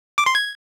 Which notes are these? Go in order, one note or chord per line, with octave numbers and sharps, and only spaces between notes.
D6
C6
G#6